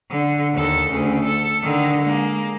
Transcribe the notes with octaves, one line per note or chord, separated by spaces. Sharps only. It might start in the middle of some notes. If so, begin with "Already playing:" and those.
D3
D#2 A4
D2 C#3
A4
D3 D#3
G#3 A#3